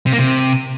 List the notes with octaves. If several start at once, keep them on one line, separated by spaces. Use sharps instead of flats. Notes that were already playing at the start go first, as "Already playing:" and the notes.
C3
A#3
C3